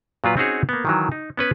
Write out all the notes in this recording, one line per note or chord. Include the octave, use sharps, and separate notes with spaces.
A#2 F#3 F4 B4
C4 C#4 D#4 F#4 G#4 C#5
A#3 B3
D#3 E3 F#3
D#4
B3 C#4 B4